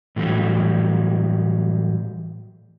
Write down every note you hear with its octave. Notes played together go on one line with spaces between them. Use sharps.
A2 E3 F#3 G3